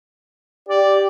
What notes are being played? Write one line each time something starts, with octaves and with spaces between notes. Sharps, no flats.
G4 D5